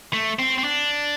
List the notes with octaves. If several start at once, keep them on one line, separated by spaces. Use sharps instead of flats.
A3
C4
C4
D4